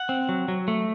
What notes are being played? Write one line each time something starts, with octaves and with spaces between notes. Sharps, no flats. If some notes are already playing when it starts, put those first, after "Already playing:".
Already playing: F#5
C4
F#3
F#3
A3